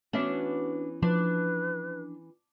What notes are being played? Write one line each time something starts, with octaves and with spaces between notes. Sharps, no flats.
E3 B3 C#4 D4 F#4 E5
F3 D4 B4